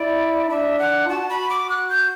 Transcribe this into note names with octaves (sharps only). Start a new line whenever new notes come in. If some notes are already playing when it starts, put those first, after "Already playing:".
Already playing: E4 D5
D4 E5
F#5
F#4 A5
B5
D6
F#6
G6